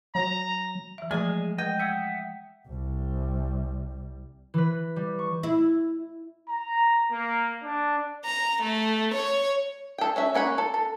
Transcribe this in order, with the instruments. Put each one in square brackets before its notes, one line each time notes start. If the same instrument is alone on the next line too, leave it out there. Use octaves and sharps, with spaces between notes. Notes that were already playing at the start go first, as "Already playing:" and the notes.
[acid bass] F#3 [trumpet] A#5
[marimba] E3 E5
[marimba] F3 A3 D5 [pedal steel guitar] G#3 G#4 [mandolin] G#5 D#6
[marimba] G#3 [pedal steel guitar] D#5 [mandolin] G5
[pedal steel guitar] E5 F#5 D#6 [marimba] E6 G6 G#6
[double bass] C2 G3
[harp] E3 B4
G3
C#6
[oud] E4
[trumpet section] A#5
A#3
D4
[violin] A#5
A3
C#5
[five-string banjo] A4 G5
C#4 F#4 E5
A#3 C#4 F#5 B5
A4
A4